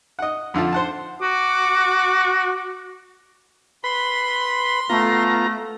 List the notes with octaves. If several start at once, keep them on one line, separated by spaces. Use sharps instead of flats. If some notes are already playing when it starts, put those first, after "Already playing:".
D#5 F#5
F2 D3 F4 A5
C5 F#5 A5
F#4 D6
B4 B5 C6
A3 B3 F4 A#5